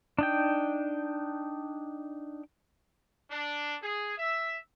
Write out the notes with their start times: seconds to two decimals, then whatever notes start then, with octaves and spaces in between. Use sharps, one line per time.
0.19 D4 D#4 G5
3.30 D4
3.82 G#4
4.17 E5